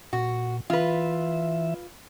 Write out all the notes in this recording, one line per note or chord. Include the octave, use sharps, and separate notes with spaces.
A#2 F#4
E3 F4 B4 E5